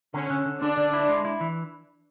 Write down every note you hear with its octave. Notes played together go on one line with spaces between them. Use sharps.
D3 C#4
D3
D3
D3 D4
D3
E4
G#3
E4
E3